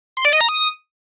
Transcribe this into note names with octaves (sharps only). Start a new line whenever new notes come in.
C6
D5
D#5
A#5
D#6